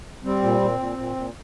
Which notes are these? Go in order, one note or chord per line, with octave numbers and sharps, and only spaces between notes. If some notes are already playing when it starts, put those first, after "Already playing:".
G3 C4
A#2
A#2
A#2
A#2
A#2